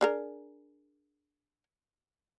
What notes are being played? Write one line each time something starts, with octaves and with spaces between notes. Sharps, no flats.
D4 G#4 A#4